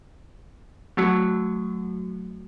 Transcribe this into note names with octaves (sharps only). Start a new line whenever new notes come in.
F#3 A3 F#4